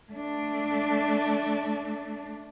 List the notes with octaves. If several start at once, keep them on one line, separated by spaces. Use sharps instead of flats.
A3 D4